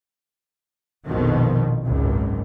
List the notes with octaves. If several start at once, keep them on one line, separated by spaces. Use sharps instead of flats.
A#1 F2 B2 D#3 F3
G#1 C#2 F#2